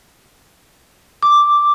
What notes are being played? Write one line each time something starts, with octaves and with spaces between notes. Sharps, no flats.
D6